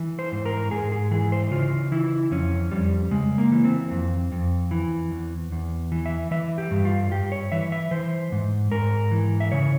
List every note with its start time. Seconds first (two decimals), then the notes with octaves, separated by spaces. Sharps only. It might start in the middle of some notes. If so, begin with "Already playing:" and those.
Already playing: E3
0.19 C5
0.32 G#2
0.46 A#4
0.71 G#2 G#4
0.92 G#4
1.11 E3 G#4
1.32 C5
1.51 C#3 F4
1.92 E3 E4
2.31 F2 C#4
2.71 F2 G3
3.11 C#3 G#3
3.38 A#3
3.52 E3
3.65 C4
3.91 F2
4.32 F2
4.71 E3
5.11 E2
5.52 E2
5.92 E3
6.06 E5
6.31 E3 E5
6.58 G4
6.71 G2
6.85 F4
7.11 G2 G4
7.32 C#5
7.52 E3 E5
7.72 E5
7.91 E3 C5
8.32 G#2
8.71 G#2 A#4
9.12 E3
9.40 E5
9.52 C#3 C#5